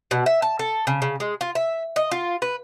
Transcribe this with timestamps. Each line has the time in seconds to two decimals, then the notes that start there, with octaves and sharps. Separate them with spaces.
0.11 B2
0.26 E5
0.42 A5
0.59 A4
0.87 C#3
1.02 C#3
1.20 G#3
1.41 F4
1.55 E5
1.96 D#5
2.11 F4
2.42 B4